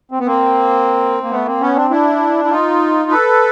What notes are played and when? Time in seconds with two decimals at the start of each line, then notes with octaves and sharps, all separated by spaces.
0.11 C4
0.20 B3
0.26 A#3 C4
1.23 A#3
1.31 A3 B3
1.46 A#3 C4
1.61 B3 C#4
1.76 C4 D4
1.90 D4 E4
2.45 E4
2.50 D#4 F4
3.11 A4 B4